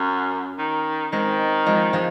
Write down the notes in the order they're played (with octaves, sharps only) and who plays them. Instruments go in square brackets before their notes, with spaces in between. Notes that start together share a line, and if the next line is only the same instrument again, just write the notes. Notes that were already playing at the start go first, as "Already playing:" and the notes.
Already playing: [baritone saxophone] F#2 [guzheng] C#4
[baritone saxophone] D#3
[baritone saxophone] D#3 [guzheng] G#3 C4
[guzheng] F3 G#3
F3 G#3